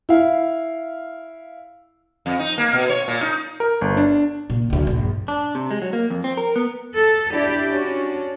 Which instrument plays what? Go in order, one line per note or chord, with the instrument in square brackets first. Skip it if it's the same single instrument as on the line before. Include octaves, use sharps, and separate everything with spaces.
[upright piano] E4 F5
[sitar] F2
D#4
A#3
B2
C#5
A#2
D#4
[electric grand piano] A#4
G1
D4
[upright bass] A#2
D2 F#3
A#1 G2
[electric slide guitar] D4
C3
G#3
F#3
A#3
F2
C4
A#4
B3
[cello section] A4
D4 E4 G4 D5
C#4 D4 F#4